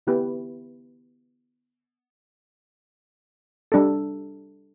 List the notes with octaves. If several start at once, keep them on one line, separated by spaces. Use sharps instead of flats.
D3 B3 E4 G4 B4
G3 D4 A4